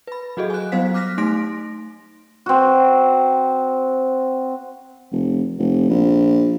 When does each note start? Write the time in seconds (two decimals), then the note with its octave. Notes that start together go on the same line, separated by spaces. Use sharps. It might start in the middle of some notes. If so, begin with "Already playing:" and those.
0.07 B4 B5
0.37 F#3 F#4 G#4 A4 D#5
0.50 G#5 F#6
0.72 F#3 G3 B3 C5 F5 B6
0.94 D6 F6 F#6 A#6 B6
1.18 A3 D#4 C6 A#6 D7
2.46 C4 F#4
5.12 F1
5.59 F1
5.90 A#1